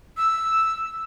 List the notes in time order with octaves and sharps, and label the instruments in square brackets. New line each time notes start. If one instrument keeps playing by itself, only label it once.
[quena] E6